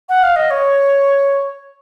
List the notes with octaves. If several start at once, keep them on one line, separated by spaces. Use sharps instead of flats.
F#5
F5
D#5
C#5